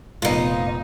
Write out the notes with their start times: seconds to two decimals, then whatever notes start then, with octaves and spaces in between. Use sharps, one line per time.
0.22 F1 A#2 B3 D#4 F4 D#5